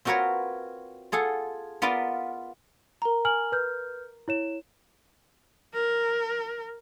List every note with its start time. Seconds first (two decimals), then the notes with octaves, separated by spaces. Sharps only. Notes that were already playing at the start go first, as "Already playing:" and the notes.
0.05 C4 F4 F#4 A#4 B4 C#5
1.12 F4 G#4 A4 F#5
1.82 B3 F4 A#4 B4 D5 F5
3.02 A#4 A#5
3.25 G#5 F6 F#7
3.52 B4 F6 G6
4.28 E4 C#5 E7
5.74 A#4